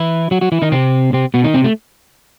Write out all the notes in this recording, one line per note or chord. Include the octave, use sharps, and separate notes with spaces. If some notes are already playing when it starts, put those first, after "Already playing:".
Already playing: E3 E4
F#3 F#4
F#3 F#4
E3 E4
D#3 D#4
C3 C4
C3 C4
B2 B3
D#3 D#4
C3 C4
A3